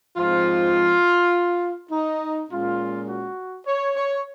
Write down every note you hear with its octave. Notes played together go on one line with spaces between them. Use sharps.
G#2 F3 C4 F4
D#4
A#2 G#3 C#4 F4
F#4
C#5
C#5